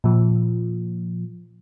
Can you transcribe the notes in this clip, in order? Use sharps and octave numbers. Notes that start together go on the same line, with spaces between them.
A#2 F3